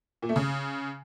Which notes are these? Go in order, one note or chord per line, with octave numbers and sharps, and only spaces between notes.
A#2
A3
C#3